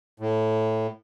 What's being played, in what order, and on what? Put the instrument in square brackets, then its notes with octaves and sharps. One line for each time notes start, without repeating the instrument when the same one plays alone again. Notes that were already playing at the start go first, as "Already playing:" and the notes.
[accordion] A2